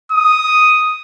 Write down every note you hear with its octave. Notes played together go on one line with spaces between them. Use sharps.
D#6